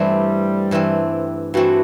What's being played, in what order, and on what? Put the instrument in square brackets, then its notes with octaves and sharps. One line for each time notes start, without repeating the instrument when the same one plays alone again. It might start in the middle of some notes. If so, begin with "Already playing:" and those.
Already playing: [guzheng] G2 E3 A3 C4 [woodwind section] G3
[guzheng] G2 E3 A3 C4
[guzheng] G2 E3 A3 C4 [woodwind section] F#4